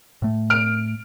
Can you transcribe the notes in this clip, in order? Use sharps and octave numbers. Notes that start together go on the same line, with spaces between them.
A2 A3
F6 D7